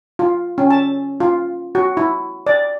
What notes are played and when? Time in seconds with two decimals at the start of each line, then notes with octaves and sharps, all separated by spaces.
0.19 F4
0.58 C#4
0.70 A5
1.20 F4
1.75 F#4
1.97 E4
2.47 D5